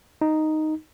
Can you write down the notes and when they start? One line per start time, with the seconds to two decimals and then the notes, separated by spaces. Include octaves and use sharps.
0.21 D#4